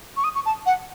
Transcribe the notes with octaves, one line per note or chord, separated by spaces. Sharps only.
C#6
D#6
C#6
A5
F#5